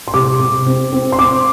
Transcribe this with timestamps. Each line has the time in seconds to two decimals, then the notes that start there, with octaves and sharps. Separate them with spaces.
0.08 C6
0.14 C3 D6
0.40 C3
0.66 C4
0.93 C4
1.12 C6
1.19 C4 D6